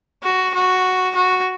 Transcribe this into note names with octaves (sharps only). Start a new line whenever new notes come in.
F#4
F#4
F#4